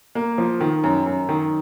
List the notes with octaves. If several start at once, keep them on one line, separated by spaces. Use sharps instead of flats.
A#3
F3
D#3
F#2
F#2
D#3